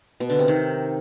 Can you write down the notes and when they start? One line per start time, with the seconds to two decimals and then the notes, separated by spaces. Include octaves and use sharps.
0.20 B2
0.30 D3
0.39 C3
0.48 D#3